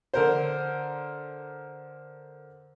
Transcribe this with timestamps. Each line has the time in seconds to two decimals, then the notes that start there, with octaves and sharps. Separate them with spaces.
0.14 D3 A#4 C5